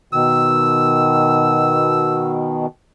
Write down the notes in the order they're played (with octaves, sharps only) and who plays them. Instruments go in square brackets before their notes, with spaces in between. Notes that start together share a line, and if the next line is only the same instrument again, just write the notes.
[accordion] B2 D#3 [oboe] E6